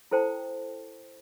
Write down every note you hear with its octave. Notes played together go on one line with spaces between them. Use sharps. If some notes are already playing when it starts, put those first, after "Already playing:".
E4 A4 C5 G5 A5